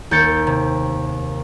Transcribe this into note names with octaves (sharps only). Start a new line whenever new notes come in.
D#2 G6 A6 C#7
C3